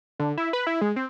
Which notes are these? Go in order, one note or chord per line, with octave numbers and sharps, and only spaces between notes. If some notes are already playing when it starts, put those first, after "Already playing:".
D3
E4
B4
E4
G#3
C4